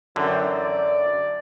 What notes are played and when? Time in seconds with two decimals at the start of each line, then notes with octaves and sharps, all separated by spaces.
0.16 F#2 D3 E3 C4
0.50 D5